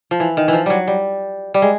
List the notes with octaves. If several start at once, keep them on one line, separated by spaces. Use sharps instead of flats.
F3
E3
D#3
E3 F3
F#3 G3
G3
G3
G#3